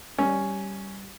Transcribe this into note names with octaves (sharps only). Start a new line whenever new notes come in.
G3 C#4